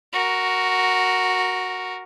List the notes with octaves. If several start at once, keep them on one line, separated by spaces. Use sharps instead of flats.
F#4 A#4